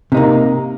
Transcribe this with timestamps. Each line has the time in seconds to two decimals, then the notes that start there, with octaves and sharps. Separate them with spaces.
0.12 C3
0.14 D#4
0.17 A#3